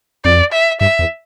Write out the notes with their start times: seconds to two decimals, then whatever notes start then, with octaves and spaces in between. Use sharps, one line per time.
0.24 F2 D5
0.52 E5
0.81 G2 E5
0.99 E2